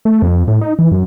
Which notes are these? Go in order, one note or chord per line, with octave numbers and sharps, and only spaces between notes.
A3
F2
A2
D#4
E3
F#2